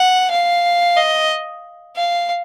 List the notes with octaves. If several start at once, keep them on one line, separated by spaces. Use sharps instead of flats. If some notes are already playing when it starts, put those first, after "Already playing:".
Already playing: F#5
F5
D#5
F5